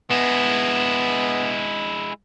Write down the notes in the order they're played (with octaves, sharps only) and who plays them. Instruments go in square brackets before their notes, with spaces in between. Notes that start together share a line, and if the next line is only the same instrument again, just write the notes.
[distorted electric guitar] G#3 E4 [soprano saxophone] B3